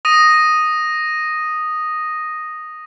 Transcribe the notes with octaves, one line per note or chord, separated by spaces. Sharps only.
D#6 A#6 D#7